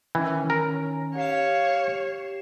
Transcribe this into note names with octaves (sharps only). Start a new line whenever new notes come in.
D#3 E3 C#4
A#4
G4 C#5 F5 C7 E7